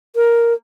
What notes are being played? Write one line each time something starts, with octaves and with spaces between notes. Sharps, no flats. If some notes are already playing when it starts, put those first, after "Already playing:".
A#4